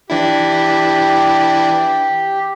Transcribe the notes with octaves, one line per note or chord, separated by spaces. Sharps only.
E3 D4 E4 G4